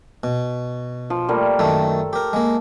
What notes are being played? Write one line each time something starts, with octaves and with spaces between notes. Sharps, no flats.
B2
F3
G3 A3 A#3
F#2 D#3 A3 A4
G4 A#4
G#3 A#3